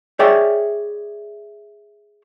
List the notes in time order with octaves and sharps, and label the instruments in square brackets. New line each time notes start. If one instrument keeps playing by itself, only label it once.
[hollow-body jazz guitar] G#4 C#5 D5 E5 G5